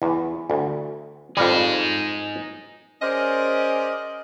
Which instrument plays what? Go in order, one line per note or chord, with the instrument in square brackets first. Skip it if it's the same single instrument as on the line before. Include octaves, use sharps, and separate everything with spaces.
[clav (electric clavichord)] E2
D2
[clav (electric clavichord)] F2 G3 [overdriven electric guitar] D#4 G#4
[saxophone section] C#4 G#4 A#4 C5 D5 D#5